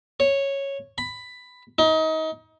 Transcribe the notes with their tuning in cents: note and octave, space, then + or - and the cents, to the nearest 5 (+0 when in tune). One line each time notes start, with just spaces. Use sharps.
C#5 -5
B5 +10
D#4 +30